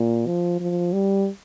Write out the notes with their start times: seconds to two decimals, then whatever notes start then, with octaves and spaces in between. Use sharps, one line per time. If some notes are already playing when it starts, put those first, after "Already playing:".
Already playing: A#2
0.27 F3
0.60 F3
0.93 G3